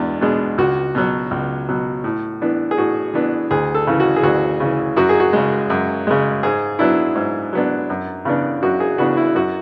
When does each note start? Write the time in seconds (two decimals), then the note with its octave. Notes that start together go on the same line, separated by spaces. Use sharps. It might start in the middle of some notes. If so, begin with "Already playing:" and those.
Already playing: E2 B2 G#3 D4
0.21 B2 G#3 D4
0.58 C#2 F#4
0.95 B2 F#3
1.31 C#2
1.69 B2 F#3
2.04 A2
2.42 E3 B3 D4
2.71 G#4
2.78 A2 F#4
3.14 E3 B3 D4
3.51 D2 G#4
3.75 A4
3.87 C#3 E3
4.00 F#4
4.16 G#4
4.23 D2 F#4
4.60 C#3 E3
4.96 F#2 F#4
5.09 G#4
5.20 F#4
5.33 C#3 G#3
5.70 F#2
6.07 C#3 G#3
6.43 G#2 G#4
6.79 F#3 B3 D4 E4
7.15 G#2
7.53 F#3 B3 D4
7.90 F#2
8.25 C#3 E3 B3 D4
8.62 F#2 F#4
8.80 G#4
8.98 C#3 E3 B3 D4 F#4
9.17 E4
9.35 F#2 F#4